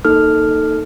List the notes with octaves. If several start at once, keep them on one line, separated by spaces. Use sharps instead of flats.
A#3 D#4 A4 F6